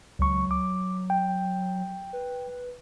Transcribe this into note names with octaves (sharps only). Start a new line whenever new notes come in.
C#2 F#3 C#6
D6
G5
B4